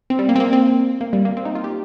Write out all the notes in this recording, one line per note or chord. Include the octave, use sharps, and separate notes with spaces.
C4
G3
A#3
C4
A#3
C4
A#3
G3
A#3
C4
D#4
F4
G4